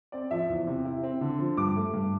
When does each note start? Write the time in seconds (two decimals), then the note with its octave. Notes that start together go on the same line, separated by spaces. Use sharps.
0.12 C4 D5
0.31 F3 E5
0.49 E2
0.67 C3
0.85 E4
1.03 C4
1.21 D3
1.39 F3
1.57 G2 D6
1.76 A3
1.93 G2